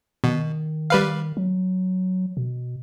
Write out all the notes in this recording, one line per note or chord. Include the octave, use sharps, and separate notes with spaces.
B2 D#3
G3 B4 F5
F#3
B2